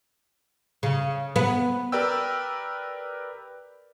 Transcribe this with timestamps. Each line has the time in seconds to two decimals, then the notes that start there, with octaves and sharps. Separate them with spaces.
0.83 C#3
1.36 B3
1.92 G4 A#4 B4 D5 G5 E6